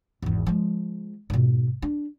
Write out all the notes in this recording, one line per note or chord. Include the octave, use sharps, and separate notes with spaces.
G#1 E2
F3 G#3
G#2 B2
D4